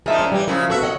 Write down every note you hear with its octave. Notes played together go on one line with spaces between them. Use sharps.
F3 G#3 D#4 G#4 A#4 E5
C#4
E3 G3 G4
F#2 C#3 F3 E4 A#4
B3 D#4 F#4 A4 E5
C#5 D#5 F#5